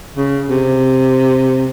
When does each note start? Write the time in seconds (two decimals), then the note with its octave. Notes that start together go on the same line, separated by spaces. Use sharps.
0.17 C#3
0.50 C3